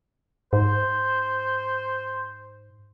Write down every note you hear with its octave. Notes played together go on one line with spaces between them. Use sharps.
G#2 C5